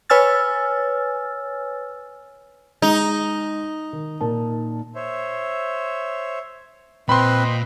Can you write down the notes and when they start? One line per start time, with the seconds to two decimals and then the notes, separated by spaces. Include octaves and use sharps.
0.10 B4 C#5 G#5 E6 F6 A6
2.82 G#3 D#4
3.93 D#3
4.21 A#2 A#4 A5
4.95 C5 C#5 E5
7.09 A#2 C4 B4 C5 D#5 G5 B5 C6